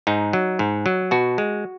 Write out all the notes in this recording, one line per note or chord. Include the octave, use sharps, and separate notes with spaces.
G#2 D#4
F#3
G#2
F#3
B2 F#4
G#3